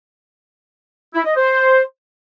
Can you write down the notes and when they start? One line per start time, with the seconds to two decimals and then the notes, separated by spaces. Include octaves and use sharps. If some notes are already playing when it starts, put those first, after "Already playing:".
1.14 E4
1.25 D#5
1.36 C5